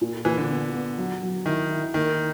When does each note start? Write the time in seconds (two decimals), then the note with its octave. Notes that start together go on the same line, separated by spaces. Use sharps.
0.01 A#2
0.25 A#2 E3
0.37 D3
0.50 B3
0.74 B3
0.98 F#3
1.23 F#3
1.46 D#3 E4
1.70 E4
1.94 D#3 A#3